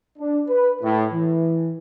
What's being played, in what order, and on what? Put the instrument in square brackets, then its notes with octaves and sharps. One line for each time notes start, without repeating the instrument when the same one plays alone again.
[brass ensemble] D4
B4
A2
E3